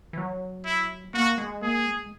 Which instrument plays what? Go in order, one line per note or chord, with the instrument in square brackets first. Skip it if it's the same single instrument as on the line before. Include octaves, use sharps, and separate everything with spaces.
[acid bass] E3
F#3
[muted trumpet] E4
[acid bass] A#3 [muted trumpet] F#4
[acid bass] G#3
[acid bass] A#3 [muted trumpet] G#4
[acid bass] G#3